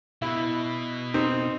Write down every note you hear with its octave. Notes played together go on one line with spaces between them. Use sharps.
B2 E4
C4 D#4